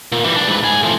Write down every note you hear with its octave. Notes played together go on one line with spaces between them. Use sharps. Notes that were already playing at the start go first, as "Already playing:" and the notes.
A#2
E3 G3
B1 D4
G#2 B4
G#2 G#4
A2 F3